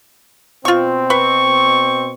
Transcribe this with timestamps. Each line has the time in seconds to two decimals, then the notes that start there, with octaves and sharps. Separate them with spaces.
0.65 B2 C4 F4 C#6
1.10 B4 C#6